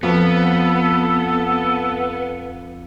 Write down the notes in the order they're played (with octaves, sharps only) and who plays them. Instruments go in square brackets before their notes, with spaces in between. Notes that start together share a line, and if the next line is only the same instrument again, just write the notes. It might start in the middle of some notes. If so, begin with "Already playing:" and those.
[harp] F2 [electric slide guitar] B3 [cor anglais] A4